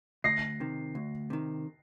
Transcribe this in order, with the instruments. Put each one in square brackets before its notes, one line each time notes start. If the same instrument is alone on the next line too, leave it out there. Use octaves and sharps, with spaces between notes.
[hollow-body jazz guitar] D2 [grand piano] A#6 C7
[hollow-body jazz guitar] C3 D#3
D2
C3 D#3